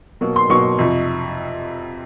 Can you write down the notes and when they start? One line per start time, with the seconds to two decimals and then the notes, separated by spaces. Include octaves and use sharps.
0.21 B2 F#3 A#3
0.36 C6
0.49 B2 F#3 A#3 C#6
0.79 F2 C3 F3